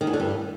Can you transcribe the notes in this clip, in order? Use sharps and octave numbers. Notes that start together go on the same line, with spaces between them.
D#3
E2
D3
G2